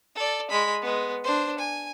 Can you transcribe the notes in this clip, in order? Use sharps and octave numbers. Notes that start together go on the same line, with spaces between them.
A4 D5
G#3 B5
G#3 B3
D4 C5
G#5